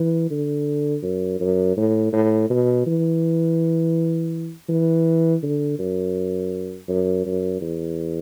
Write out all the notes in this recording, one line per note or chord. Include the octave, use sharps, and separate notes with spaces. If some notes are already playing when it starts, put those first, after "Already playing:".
Already playing: E3
D3
F#2
F#2
A2
A2
B2
E3
E3
D3
F#2
F#2
F#2
E2